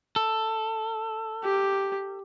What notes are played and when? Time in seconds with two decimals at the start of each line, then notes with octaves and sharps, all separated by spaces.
0.16 A4
1.44 G4